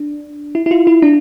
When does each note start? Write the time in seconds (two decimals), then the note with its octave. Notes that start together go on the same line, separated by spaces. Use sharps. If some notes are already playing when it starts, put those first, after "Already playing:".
Already playing: D4
0.55 E4
0.66 E4
0.71 F4
0.87 E4
1.02 D4